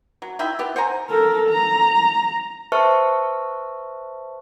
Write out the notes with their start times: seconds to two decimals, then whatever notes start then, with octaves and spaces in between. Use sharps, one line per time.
0.22 F#3
0.39 D#4 E4 E5 G5
0.59 B3 G4
0.76 C5 F#5 G#5 A#5
1.10 A4 A#4
1.49 A#5
2.72 B4 C5 E5 A5 C#6 F6